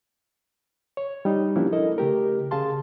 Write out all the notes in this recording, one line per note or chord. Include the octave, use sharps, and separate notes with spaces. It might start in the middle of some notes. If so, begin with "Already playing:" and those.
C#5
G3 D#4
F3 A#3 C#4 D4 E4 G4
E4 A4 A#4 D#5
C#3 A3 G4 A#4
C#3 G#4 F5 A5 C6